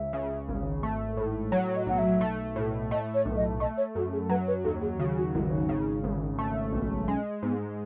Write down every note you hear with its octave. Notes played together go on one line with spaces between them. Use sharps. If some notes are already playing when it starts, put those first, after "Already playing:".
Already playing: C#2 E5
C#3
G#1
A3
A2
F#3 C#5
D#5
B1 F#5
E5
A3
A2
A3 D#5
C#5
B1
D#5
A3 D#5
C#5
F#2 A4
G#4
F#3 B4
B4
D#2 A4
G#4
C#3 F#4
F#4
G#1 E4
D#4
C#3
G#1
A3
B1
G#3 C#4
G#2 B3